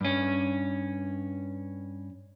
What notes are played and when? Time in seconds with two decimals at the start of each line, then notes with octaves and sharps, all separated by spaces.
0.01 G2 C#4